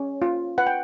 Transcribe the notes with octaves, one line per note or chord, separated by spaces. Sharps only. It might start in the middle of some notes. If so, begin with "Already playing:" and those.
Already playing: C#4
F4
B4 F#5
G5